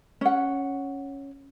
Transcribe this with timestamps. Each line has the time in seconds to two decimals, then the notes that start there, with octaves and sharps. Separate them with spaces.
0.21 C#4 F#5